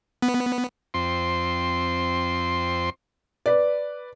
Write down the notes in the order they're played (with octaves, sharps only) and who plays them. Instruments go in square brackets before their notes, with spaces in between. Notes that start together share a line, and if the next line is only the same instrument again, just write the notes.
[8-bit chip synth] B3
[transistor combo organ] F2 C4 C6
[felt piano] B4 D5